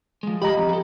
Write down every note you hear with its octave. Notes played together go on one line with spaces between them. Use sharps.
F3 G#3
G4 D#5 A#5 B5
F3 C4
G#4 A4